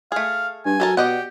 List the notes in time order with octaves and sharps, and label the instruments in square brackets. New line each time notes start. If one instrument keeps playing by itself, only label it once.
[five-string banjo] A3 G#4 [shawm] F5
[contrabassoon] G2 [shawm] G#5
[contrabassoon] F#3 [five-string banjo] A4 A#4 A5
[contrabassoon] B2 [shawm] G4 [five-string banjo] D5 D#5 F#5